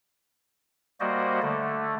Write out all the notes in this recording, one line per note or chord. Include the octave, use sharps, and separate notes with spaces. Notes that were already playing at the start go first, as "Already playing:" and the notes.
G3 A#3 F#4 C5 D5 D#5
D3 A3